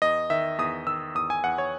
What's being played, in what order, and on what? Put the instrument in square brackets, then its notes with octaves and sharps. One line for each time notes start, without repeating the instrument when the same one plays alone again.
[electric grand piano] E2 D#5
D#3 E5
E2 D#6
D#3 E6
E2 D#6
G#5
E2 F#5
C#5